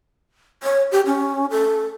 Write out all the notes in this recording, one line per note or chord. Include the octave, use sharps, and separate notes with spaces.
C#5
G4
C#4
A4